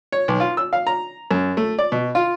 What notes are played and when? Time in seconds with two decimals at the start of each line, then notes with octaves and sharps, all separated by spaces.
0.12 C#5
0.28 B1
0.40 F4
0.57 E6
0.73 F5
0.87 A#5
1.31 F#2
1.57 A3
1.79 D5
1.92 B2
2.15 F4